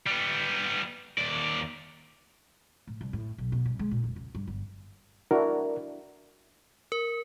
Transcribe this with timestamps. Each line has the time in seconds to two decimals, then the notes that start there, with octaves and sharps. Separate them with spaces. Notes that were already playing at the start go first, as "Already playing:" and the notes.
0.06 G3 B3
1.18 D#2 D5
2.87 A2
3.01 C2
3.13 A2
3.38 B1
3.52 B2
3.65 C2
3.79 G#3
3.91 A#2
4.04 F1
4.16 C#2
4.35 G2
4.47 G1
5.31 D4 E4 F#4 A#4
6.92 A#4